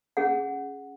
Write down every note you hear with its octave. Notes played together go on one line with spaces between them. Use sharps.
C#4 G#4 F#5